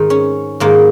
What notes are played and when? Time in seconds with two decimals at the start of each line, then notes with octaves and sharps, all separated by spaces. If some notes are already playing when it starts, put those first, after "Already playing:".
Already playing: G#2 D#3 D#4
0.10 C#4
0.60 G#2 D#3 A#3